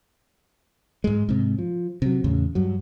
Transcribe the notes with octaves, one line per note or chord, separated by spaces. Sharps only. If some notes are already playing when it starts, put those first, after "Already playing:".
G#2 G#3
G#2 C3
F3
C3 F#3
E2 A2 C#3
G2 F#3